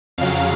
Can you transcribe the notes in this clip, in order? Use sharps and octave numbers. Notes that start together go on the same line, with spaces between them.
F2 C#3 F#3 F5